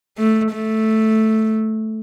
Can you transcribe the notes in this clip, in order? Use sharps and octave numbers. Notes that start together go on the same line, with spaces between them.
A3
A3